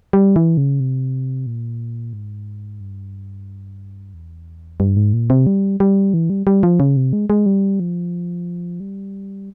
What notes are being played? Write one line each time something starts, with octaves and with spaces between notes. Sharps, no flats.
G3
E3
C#3
C3
A#2
G#2
G2
E2
G2
G#2
A#2
C3
G3
G3
E3
G3
G3
F3
C#3
C3
G#3
G#3
G3
F3
G3